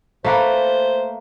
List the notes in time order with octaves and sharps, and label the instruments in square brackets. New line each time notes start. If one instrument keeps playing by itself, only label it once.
[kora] A3 A#3 B4 [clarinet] C5